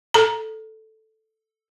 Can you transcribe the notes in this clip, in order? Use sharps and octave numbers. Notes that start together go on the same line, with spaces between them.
A4 A#5